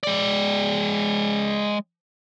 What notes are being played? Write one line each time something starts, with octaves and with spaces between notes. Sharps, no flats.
G#3 D5